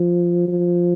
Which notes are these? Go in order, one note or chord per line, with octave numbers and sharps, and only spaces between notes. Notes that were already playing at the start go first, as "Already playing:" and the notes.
Already playing: F3
F3